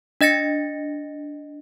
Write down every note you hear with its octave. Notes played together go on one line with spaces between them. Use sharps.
D4 D#5 A6 A#6 C#7